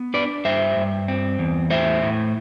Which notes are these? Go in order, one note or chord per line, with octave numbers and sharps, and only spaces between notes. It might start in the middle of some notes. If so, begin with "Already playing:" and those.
Already playing: B3
D4 B4 D5
G2 C5 E5
G2
C4
E2
A2 C5 E5
A2